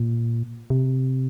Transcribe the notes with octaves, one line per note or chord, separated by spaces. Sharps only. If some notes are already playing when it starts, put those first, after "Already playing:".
Already playing: A#2
C3